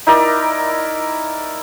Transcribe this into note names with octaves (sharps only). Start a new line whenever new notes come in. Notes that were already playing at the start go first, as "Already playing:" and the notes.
D#4 E4 A#4 D5